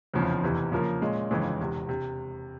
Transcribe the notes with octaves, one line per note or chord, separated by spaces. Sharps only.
F1 E2 C#3 F3 C4
F1 E2 C3 E3
C#3 F3 A#3 F4 A#4
A#2 G#3 C#4
G1 F2 C#3 E3 G#3
E1 E2 C3
C3